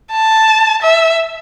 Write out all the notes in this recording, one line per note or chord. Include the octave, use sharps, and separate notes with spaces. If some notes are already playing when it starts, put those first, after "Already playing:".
A5
E5